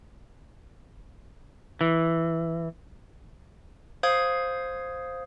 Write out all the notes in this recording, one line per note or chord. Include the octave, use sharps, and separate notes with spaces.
E3
C5 F5 D#6 G#6